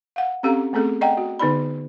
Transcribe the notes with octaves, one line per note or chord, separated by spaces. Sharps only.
F5 F#5
C4 C#4 G4 A4 F5 A#5
A3 B3 C4 G#4 A4
D5 D#5 F#5 G5 A#5
F#4
D3 B3 D#4 G#4 D5 B5